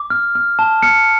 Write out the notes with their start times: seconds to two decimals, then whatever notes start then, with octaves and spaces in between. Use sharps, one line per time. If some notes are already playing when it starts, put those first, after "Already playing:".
Already playing: D6
0.10 F6
0.35 F6
0.59 A5
0.82 F6 C#7